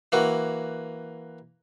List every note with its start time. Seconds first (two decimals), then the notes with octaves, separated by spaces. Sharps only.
0.12 E3 A#3 F#4